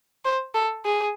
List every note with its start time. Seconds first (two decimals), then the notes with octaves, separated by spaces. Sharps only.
0.25 C5
0.55 A4
0.85 G#4